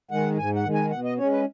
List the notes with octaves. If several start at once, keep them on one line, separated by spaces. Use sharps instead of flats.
D#3 G#3 F#5
G#2 G#5
F#5
D#3 G#3
G#5
B2 F#5
D#5
G#3 C#4 C#5
B4